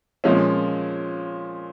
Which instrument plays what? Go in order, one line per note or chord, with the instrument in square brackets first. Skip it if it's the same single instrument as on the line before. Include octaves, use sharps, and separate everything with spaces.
[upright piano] A#2 F3 G#3 C#4